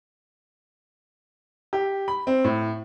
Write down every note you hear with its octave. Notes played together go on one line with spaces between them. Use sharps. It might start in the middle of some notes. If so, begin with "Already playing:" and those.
G4
B5
C4
A2